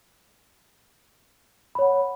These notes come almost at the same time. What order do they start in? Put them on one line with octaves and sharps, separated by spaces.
B5 C#5 F#5